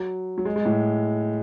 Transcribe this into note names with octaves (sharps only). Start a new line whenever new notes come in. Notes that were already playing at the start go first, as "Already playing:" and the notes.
Already playing: F#3
F#3
G#3
G#3
A2